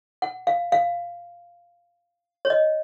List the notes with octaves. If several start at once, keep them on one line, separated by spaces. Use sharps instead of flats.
F#5
F5
F5
C#5
D#5